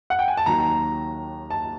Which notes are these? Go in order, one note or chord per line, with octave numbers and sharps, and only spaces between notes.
F#5
G5
G#5
A5
D#2 D#3 F#3 A#5
A5